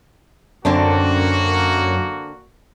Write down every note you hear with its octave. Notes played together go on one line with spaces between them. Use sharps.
F#2 D3 A#3 C4 D4 F#4